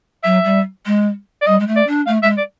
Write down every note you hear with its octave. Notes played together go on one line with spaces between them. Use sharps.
F#3 E5
G3
G#3
D5
G3 D#5
G#3
A3
D5
D4
A3 F5
G#3 E5
D5